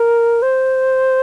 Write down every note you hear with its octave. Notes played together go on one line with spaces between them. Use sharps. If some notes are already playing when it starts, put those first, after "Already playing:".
Already playing: A#4
C5